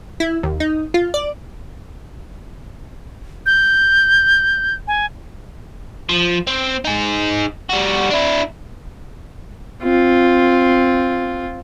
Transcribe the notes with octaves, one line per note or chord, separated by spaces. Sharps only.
E4
D#2
D#4
F4
D5
G6
G#5
F3
C4
D#4 G#4
G3 F#4
D4 E4
C4 F4